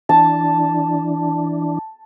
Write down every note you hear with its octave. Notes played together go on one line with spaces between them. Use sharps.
E3 D4 A5